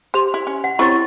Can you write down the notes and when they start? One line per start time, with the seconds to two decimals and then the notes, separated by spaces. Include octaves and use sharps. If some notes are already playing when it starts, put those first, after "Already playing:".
0.14 G4 C5 F7
0.34 E4
0.47 C#4
0.64 F#5
0.79 C4 E4 G4 C5 C#5 C#6 A6